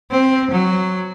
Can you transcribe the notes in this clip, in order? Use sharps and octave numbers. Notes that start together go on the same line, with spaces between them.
C4
F#3